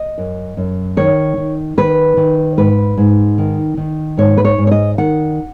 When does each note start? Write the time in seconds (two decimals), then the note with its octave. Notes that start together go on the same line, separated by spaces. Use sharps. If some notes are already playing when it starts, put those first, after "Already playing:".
Already playing: D#5
0.18 F#2
0.57 F#2
0.97 D#3 C#5
1.37 D#3
1.77 D#3 B4
2.17 D#3
2.57 G#2 B4
2.97 G#2
3.38 D#3
3.77 D#3
4.17 G#2 C#5
4.37 B4
4.45 C#5
4.58 G#2
4.67 C#5
4.71 D#5
4.98 D#3 F#5